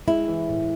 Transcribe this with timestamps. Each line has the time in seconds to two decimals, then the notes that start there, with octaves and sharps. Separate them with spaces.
0.08 G#3 E4
0.28 E3
0.48 A2